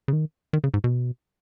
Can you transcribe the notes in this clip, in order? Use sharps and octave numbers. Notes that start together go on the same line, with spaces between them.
C#3
D#3
D#3
C#3
G#2
B2